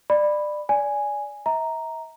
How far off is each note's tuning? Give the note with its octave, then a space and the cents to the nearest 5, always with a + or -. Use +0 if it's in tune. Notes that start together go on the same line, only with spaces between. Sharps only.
D5 +25 B5 +0
D5 -20 G#5 +0
E5 -40 A#5 +0